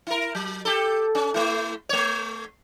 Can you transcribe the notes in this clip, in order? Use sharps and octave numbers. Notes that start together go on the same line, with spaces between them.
E4 A#4
F#3
G4 A4
C#4
A3 E4
A3 C#5